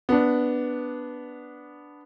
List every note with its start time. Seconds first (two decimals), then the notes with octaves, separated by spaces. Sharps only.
0.09 B3 D4